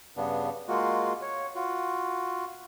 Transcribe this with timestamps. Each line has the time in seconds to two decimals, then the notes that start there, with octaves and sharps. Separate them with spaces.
0.17 G2 C#3 B3 D4
0.68 G#3 A#3 F4 F#4
1.22 C#5
1.55 F4 F#4